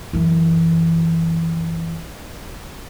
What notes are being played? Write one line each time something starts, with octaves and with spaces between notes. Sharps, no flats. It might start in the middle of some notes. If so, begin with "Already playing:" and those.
F#2 E3